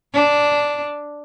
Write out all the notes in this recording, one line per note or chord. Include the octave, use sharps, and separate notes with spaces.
D4